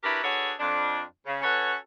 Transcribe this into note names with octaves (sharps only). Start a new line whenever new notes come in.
D4 E4 F#4 G4 A#4 B4
D4 F#4 G#4 A4 B4 C#5
F2 D4
C#3
C#4 F#4 A4 B4 C#5